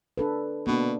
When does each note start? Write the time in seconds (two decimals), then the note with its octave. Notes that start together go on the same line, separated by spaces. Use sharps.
0.18 D4 A4 B4
0.67 B2 A#3 D4